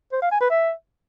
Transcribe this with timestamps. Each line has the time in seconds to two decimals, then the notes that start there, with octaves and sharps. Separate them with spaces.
0.13 C5
0.22 F5
0.31 G#5
0.41 B4
0.50 E5